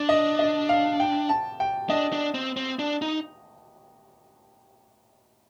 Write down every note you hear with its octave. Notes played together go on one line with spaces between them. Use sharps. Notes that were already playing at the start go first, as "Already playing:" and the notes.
Already playing: D4 D5
D#5
D#5
F5
G5
A5
G5
D4 D#5
D4
C4
C4
D4
D#4